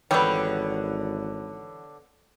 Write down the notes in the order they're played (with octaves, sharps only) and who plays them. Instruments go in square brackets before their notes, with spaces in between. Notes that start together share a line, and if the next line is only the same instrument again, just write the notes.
[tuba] G#1 [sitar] D3 C#5 [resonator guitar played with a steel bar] E3 E4 G4 [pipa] G3 B3